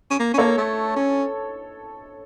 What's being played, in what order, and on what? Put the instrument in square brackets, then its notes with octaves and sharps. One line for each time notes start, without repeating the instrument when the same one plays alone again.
[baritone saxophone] C#4
A#3
C#4
[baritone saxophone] A#3 [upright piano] A4 C#5
[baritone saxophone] A3
C#4